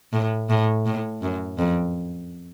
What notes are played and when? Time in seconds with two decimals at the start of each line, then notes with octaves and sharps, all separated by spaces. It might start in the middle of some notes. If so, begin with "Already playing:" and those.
0.13 A2
0.50 A2
0.86 A2
1.22 F#2
1.58 F2